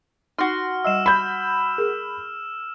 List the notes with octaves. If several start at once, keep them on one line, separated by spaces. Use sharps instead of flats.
D#4 F#4 C6 F6
G3 D#5 E5 E6 E7
B5 G6
G#4 A#4